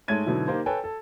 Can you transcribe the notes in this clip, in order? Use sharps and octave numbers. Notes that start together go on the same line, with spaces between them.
G#2 G#3 A3 C#5 G#6 D#7
G#2 B2 D3 F#3 E4
A#3 D#4 G4 C5
A4 B4 C#5 G5 G#5
A4